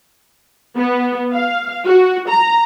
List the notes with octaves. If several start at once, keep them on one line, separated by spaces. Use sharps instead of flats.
B3
F5
F#4
A#5